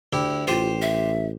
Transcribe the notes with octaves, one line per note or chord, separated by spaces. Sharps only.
D2 E4 G4
A1 F4 G4 C5
E5